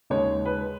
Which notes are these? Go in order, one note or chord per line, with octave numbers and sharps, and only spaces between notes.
D#2 C#3 G#3 D#4 C#5
B4